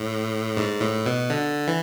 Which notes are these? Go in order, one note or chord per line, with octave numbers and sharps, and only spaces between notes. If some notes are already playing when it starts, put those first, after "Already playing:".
Already playing: A2
G#2
A2
B2
D3
E3